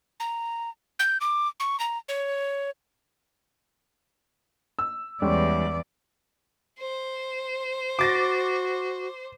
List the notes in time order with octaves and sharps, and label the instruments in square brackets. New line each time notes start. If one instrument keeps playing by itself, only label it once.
[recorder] A#5
G6
D6
C#6
A#5
C#5
[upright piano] E6
[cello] E2 D5 [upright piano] G3 G#3 C#4
[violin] C5
[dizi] F#4 [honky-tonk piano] D6 A6 A#6